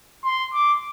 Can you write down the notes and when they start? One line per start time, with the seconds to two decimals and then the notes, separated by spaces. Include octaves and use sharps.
0.24 C6
0.54 D6